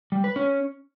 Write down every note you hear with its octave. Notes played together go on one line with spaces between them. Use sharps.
G3
B4
C#4